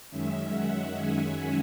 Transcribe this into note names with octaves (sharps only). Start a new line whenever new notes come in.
F#2 D#3 G#3 C#4 E5
F#5
G#5